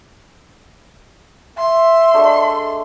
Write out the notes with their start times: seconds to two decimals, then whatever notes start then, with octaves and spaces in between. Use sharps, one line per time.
1.58 E5 C6
2.14 G#3 A3 D4